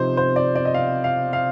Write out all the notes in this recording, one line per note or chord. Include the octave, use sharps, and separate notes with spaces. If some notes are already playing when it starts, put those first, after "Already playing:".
Already playing: C3 F3 C4 D#4 C5
C5
D5
D5
D#5
F5
F5
F5